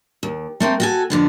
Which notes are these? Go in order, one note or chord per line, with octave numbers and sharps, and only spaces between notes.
D#2
A3 A#3 C4
F#4 A4 G#5
F2 D3 B3